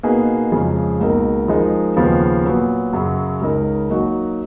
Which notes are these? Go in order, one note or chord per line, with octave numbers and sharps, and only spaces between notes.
B2 A#3 D#4 G#4 B4
F2 C#3 F3 G#3
C#2 B2 A#3 D#4 A#4
F3 G#3 D#4 A#4
D#2 C#3 F3 B3
A#2 F#3 B3
F#2 C#3 F#3
C#2 C#3 G#3 D#4 A#4
F#3 A#3 D#4 F#4